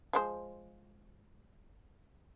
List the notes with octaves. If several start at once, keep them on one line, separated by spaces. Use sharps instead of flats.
F3 G#3 C5